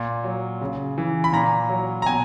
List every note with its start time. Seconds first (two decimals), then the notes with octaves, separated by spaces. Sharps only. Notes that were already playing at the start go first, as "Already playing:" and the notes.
Already playing: A#2
0.24 F#3
0.61 C#3
0.98 E3
1.24 B5
1.33 A#2 A#5
1.70 F#3
2.02 A#5
2.06 B2 G#5